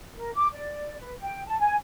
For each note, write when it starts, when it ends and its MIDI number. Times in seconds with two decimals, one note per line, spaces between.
0.17 0.30 70
0.35 0.48 86
0.53 1.00 74
1.00 1.15 71
1.21 1.46 79
1.47 1.57 81
1.60 1.75 80